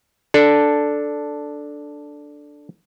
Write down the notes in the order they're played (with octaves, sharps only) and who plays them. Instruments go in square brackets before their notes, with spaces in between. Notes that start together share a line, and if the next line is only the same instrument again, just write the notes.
[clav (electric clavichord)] D4 A4